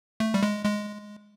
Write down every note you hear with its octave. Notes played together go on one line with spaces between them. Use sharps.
A3
G3
G#3
G#3